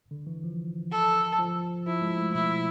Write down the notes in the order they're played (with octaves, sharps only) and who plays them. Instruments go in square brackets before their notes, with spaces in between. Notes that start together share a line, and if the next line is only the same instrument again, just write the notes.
[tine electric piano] D3
E3
F3
[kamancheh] A4
[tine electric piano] F3
[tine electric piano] F3 [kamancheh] E4
[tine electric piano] G#3
A3
[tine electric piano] B2 [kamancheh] E4